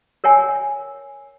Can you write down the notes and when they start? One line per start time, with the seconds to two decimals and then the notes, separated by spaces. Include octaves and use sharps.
0.24 A#4 C#5 F#5 G#5